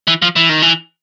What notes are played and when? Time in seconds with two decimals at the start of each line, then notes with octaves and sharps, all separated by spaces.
0.07 E3
0.22 F3
0.36 E3
0.49 D#3
0.62 E3